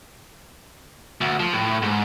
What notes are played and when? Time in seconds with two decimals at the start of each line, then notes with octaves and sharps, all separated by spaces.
1.21 D2
1.40 F3
1.53 A2
1.82 G#2